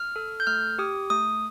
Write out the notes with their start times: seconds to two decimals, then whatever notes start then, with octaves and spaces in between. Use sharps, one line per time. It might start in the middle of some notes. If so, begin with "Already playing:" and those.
Already playing: F6
0.16 A4
0.40 G6
0.47 A3 F6
0.79 G4 D#6
1.10 A3 D#6